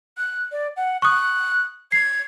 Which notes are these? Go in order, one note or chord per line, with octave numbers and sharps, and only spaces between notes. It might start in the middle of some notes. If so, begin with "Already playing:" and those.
F#6
D5
F#5
C#6 D#6 F#6
G#6 C7